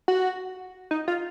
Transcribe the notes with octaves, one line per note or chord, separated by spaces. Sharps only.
F#4
D#4
F4